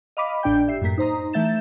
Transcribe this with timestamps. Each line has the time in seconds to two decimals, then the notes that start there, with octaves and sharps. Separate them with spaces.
0.17 D#5 F5 B5 D6 B6
0.43 G#1 A2 D4 D5 G5 G6
0.68 G4 E5 C7
0.82 F#2 A2 A#3 B6
0.98 D#4 C5 A#5 D#6
1.33 E3 A3 E5 G6 A6 E7